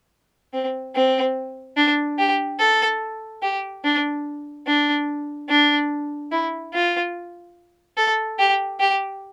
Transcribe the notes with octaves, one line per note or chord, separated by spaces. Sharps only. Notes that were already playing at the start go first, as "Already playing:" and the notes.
C4
C4
D4
G4
A4
G4
D4
D4
D4
E4
F4
A4
G4
G4